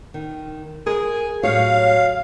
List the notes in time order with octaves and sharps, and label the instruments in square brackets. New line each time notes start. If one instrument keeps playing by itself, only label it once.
[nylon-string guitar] D#3
[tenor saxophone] G#4 [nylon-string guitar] A#4
[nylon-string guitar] A2 G4 C#5 [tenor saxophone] F#3 [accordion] F5